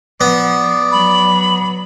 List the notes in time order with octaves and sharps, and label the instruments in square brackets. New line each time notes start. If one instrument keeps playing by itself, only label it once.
[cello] F3 [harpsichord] B3 [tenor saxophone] D5
[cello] F#3 [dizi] B5